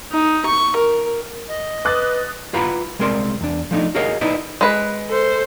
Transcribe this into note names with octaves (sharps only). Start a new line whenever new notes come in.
D#4
C#6
A#4
D#5
B4 D6 D#6 F#6 A6
E4 F4 B4 F#5 A#5 B5
C2 G#3 C4 A#4 D5 C6
E2 D4
F3 A3 D4 D#4
F#4 G#4 A#4 C#5 D#5 F5
D#4 E4 B4 C5 D5 D#5
G#3 B4
A4 C5